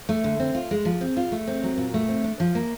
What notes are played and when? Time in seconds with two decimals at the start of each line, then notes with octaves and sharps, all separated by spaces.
0.09 A3
0.24 D3
0.40 C4
0.55 F4
0.71 G#3
0.85 F3
1.01 C4
1.17 F4
1.32 A3
1.47 C4
1.63 F#3
1.78 A#2
1.94 A3
2.08 C4
2.24 D4
2.40 F3
2.55 A#3